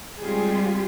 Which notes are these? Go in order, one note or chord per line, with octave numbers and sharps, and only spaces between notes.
G3 G#3 C4 F4 G4 G#4